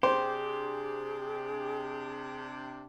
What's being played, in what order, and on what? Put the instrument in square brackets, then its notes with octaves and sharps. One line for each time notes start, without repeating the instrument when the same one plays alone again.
[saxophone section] C3 D4 [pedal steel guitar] G4 [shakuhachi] G#4 [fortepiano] C5